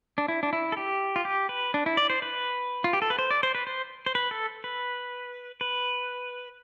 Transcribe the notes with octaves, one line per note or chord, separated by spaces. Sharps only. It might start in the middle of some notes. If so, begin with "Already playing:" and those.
D4
E4
D4
E4
A4
G4
F4
G4
B4
D4
E4
D5
C5
B4
F4
G4
A4
B4
C5
D5
C5
B4
C5
C5
B4
A4
B4
B4